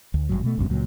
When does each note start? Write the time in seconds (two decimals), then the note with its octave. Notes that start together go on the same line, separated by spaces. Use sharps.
0.14 D2
0.29 G#1 C#2 G2 F#3
0.44 B2 A3
0.58 G1 C#2 F#2 B2
0.70 C#2 A#2 F#3